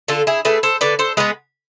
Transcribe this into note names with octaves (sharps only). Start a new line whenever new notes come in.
D3 F4 A4
E4 G#4
A3 G#4 B4
A4 C5
D3 B4 D5
A4 C5
G#3 B3 G#4 B4